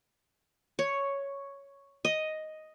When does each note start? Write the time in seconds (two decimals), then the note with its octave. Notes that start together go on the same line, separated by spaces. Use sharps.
0.79 C#5
2.05 D#5